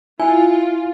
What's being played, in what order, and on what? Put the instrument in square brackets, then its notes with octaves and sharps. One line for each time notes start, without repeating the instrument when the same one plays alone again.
[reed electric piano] E4 [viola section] F4 [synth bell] G#5